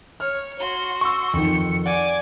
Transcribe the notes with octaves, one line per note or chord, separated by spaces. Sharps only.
C#5 F6
F#4 C6
C#6 E6
F2 D#3 C#7
D5 F#5 G#5 D6